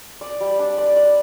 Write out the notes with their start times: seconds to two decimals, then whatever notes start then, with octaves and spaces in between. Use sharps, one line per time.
0.21 D5
0.41 G3
0.59 D4
0.78 D5
0.96 D5